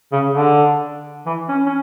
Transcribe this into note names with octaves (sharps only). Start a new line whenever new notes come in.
C#3
D3
E3
C#4
C#4